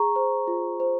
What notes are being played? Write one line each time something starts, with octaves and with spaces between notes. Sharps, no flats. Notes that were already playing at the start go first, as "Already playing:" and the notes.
Already playing: G#4 A#5 C#6
C5
F4
C5